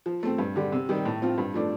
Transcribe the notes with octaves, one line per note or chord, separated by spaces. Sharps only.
F3
A3 C4
G2
D3 G3
C3
D#3 G3
A2
F3 C4 F4
G2
F3 A3 D4